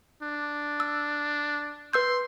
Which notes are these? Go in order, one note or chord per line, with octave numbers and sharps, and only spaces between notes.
D4
E6
B4 C6 E6 G6